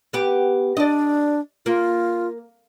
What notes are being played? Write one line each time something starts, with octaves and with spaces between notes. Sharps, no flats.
B3 G4
D4 D5 D#5
A#3 F4